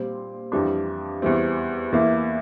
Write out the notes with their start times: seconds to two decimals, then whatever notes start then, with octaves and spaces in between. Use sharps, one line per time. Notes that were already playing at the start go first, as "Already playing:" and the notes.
Already playing: A#2 G3 C4
0.52 F2 E3 G3 D4
1.22 E2 E3 G3 C4
1.92 E2 E3 A#3 E4